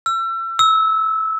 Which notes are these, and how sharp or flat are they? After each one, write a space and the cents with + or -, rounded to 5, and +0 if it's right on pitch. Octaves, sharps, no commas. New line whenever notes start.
E6 +35
E6 -20